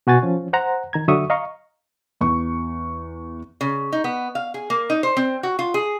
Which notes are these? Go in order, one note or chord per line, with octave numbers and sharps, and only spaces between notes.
B2 F#4 G#5 A6
F3 C#4
C5 F#5 A#5
D#3 A#5 G#6
D3 F#3 F#4 E5 C#6 D#6
D#5 F5 A#5 C#6
E2 C#6
C#3
D#4
B3
F5
G#4
A#3
D#4
C5
C4
F#4
F4
G#4